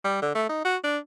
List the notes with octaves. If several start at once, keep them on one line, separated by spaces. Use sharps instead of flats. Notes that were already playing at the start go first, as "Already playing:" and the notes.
G3
D3
A3
D#4
F#4
D4